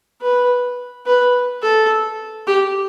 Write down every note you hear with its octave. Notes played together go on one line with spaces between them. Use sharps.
B4
B4
A4
G4